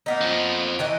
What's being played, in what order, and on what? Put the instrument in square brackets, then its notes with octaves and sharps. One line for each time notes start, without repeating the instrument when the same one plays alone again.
[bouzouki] A#3 B3 D#4
[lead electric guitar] F2 F3
[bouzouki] D#3 E3 D#5